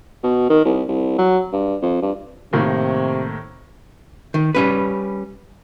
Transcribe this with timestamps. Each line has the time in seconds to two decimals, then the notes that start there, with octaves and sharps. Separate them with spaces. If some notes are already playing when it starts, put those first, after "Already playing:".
0.24 B2
0.50 D#3
0.65 C2
0.89 C2
1.18 F#3
1.53 G2
1.82 F2
2.02 G2
2.53 A2 C3 D#3 A#3
4.34 D#3
4.55 G3 C#4 B4